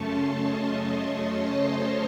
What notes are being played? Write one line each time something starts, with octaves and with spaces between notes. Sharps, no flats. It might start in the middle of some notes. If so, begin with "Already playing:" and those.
Already playing: F#2 C#3 A3 C#4 A5 C6 C#6
D#5
C#5
C5